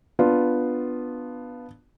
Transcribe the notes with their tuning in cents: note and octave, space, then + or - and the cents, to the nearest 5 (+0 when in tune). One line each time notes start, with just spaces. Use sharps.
B3 +0 D4 +0 F4 +0